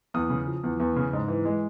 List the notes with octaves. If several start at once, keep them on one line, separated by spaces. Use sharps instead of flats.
E2 D#6
C#3
F3
E2
E2
C#3
G#2
E3
G#3